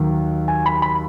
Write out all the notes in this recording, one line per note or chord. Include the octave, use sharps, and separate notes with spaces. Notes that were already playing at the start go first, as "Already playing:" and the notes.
Already playing: D#2 D#3 F#3
G#5
B5
B5